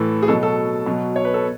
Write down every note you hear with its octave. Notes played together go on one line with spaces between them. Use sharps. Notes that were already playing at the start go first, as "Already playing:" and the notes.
Already playing: A2 E3 A4
G#4
B2 F#3 A4
A4
B2 F#3
C#5
B4
A4